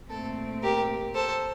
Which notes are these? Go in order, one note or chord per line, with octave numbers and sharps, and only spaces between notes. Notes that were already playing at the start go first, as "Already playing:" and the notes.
A#2 A3 C4 A4
G4 A#4
A4 C5